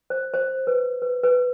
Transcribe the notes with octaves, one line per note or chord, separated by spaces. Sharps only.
C5
C5
B4
B4
B4